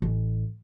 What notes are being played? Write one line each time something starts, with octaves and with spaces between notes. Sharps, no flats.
A1